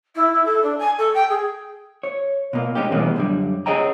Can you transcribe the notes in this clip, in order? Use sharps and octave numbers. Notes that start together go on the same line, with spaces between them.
E4
E4
A4
D4
G#5
A4
G5
G#4
C#5
B2 A#3
G#3 C#4 D#4 G4
B2 E3 G3 G#3 A#3 B3
F#2 D3 G3
C#4 G#4 C#5 D#5 G5 A#5